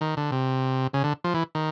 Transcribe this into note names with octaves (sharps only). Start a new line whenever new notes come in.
D#3
D3
C3
C#3
D3
F3
E3
D#3